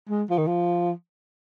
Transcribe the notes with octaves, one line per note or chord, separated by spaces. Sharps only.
G#3
F3
D#3
F3